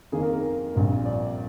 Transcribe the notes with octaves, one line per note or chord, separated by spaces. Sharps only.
F2 D#3 A#3 G#4
A#4
A#4
A#1 A#2 G3 C4
D5